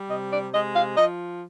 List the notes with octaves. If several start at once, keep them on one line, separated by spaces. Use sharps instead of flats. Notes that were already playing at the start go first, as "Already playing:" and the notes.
Already playing: G3
C3 D#5
D5
G#3 D#5
F5
F3 D#5